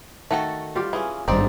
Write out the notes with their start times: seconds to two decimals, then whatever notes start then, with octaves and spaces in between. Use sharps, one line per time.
0.31 D#3 A3 F#4 A4
0.75 G3 F4 G4
0.93 E3 C#4 G#4
1.28 G#1 G2 C4 D#4 D5